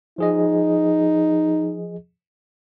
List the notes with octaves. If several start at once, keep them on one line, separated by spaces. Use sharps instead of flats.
F3 D#4 G#4 D#5